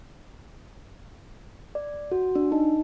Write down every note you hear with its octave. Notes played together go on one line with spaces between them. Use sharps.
D5
F#4
D4
D#4